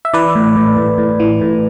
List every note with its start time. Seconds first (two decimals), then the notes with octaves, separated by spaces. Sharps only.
0.05 E5
0.13 E3 B4 D5
0.35 A2
0.56 A2
0.77 A2
0.98 A2
1.20 E3
1.41 A2